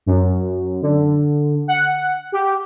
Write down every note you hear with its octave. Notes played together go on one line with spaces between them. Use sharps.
F#2
D3
F#5
G4